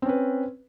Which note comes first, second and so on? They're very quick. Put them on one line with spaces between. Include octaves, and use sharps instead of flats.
C4 C#4 B4